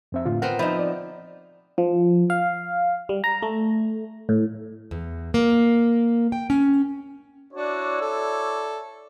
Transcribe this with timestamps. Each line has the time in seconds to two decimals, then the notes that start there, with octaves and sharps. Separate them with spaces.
0.12 F2 C4 E5
0.26 A2 D3 F4
0.42 B3 C4 A#4 F#5
0.59 F3 D#4 E5 B5
0.79 D5
1.78 F3
2.30 F5
3.09 G3
3.24 A#5
3.42 A3
4.29 A2
4.91 E2
5.34 A#3
6.32 G5
6.50 C#4
7.53 D4 E4 F#4 C#5 D5
8.01 A4